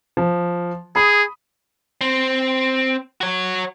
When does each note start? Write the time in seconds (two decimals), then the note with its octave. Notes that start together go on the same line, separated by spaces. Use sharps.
0.17 F3
0.96 G#4 B5 D#6
2.01 C4
3.21 F#4 C#5